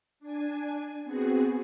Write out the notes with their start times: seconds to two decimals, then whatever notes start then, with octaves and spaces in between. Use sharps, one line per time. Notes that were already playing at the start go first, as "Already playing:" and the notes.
0.20 D4 G#5
1.04 B3 C4 F#4 G#4